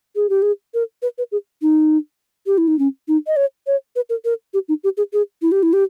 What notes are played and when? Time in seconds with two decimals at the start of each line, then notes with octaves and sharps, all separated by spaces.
0.16 G#4
0.29 G4
0.42 G#4
0.74 A#4
1.02 B4
1.18 B4
1.32 G#4
1.62 D#4
2.46 G4
2.58 E4
2.68 D#4
2.79 C#4
3.08 D#4
3.27 D#5
3.36 C#5
3.67 C#5
3.96 B4
4.10 A#4
4.25 A#4
4.54 G4
4.69 D#4
4.84 G4
4.97 G#4
5.13 G#4
5.42 E4
5.52 G4
5.63 E4
5.73 G4